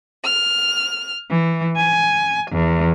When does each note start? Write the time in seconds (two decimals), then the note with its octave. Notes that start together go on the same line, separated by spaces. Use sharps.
0.22 F6
1.29 E3
1.75 G#5
2.49 E2